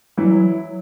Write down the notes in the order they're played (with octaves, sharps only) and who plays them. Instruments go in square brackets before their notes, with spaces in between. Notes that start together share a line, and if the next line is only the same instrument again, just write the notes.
[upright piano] E3 E4 [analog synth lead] F#3
[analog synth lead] G3
F#3